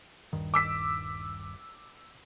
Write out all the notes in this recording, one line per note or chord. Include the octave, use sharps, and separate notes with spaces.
D#1 G2 D#3
D6 E6 B6